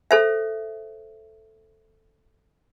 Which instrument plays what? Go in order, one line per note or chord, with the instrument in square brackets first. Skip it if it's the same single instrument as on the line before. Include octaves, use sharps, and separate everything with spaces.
[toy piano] A4 C5 E5